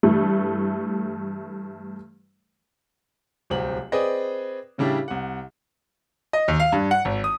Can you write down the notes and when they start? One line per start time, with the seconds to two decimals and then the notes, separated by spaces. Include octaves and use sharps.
0.03 G2 E3 A3
3.50 D1 C2 C4 F#7
3.92 C4 G#4 B4 D5 D#5
4.78 A2 C#3 G3 D4 E4 G4
5.08 C2 F#5
6.33 D#5
6.48 D#2
6.60 F5
6.72 G2
6.91 F#5
7.05 G#1
7.24 D#6